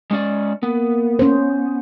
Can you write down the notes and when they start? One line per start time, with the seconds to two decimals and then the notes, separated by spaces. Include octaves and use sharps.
0.11 G#3 C#4 D5
0.63 A#3 B3
1.19 C#4 C5